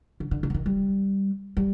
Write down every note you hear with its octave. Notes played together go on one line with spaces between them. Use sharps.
D3
D3
D3
F3
D#3
G3
G3